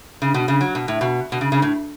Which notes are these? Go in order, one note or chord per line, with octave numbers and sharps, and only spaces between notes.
C#3
B2
C#3
F#3
B2
A2
B2
B2
C#3
C#3
A2